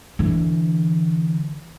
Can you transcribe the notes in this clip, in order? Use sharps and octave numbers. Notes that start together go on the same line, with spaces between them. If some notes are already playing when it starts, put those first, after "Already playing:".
D3 E3